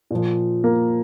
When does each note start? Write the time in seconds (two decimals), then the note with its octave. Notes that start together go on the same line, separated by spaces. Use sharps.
0.11 A#2 F3
0.64 A#3